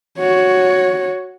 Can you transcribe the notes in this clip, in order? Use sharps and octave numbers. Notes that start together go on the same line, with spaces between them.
F#4 C#5